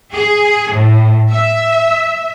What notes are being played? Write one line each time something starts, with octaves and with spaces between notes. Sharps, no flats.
G#4
A2
E5